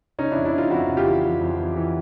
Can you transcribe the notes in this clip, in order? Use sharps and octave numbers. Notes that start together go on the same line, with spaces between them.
C#3 C#4 D#4
F2 D4 E4
D4 E4
F2 D#4 F4
F2 E4 F#4
C#3
F4 G4
E3
F2
F2
E3
E3